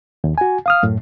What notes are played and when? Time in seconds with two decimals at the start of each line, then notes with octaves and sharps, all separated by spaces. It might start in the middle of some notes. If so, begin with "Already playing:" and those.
0.24 D#2
0.38 F#4 G#5
0.66 F5 D#6 F6
0.83 F#2 A2